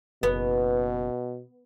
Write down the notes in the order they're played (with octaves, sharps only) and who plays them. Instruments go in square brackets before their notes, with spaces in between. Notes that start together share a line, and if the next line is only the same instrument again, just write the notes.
[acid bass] F#1 [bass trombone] B2 [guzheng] B3